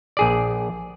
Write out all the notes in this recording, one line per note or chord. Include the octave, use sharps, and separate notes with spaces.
A#1 G#4 D5